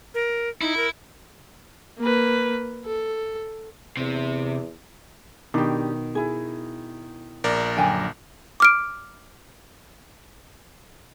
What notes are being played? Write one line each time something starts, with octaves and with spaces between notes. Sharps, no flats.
A#4
D#4 E4
A#4
A#3 B4
A4
E2 C3
B2 D#3 D4 G4
E4 G#4
A#1 A#4 D5
F#2 D3 G5 G#5
D6 F6 D7